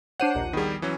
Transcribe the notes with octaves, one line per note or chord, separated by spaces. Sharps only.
D4 C5 C#5 F#5 D#7
A#1 D#2 A#2
D#3 G3 B3 G#4
E3 F#3 C#4